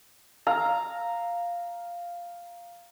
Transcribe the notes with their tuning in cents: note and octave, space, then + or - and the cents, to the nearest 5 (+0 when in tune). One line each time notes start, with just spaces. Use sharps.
F5 +0 A#5 -5